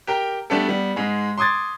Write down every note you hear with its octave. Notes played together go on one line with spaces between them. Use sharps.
G4 A#4 G5
G3 A3 B3 D4 G4 A4
G3 B3
G#2 G#3
C6 D6 D#6 G#6 A6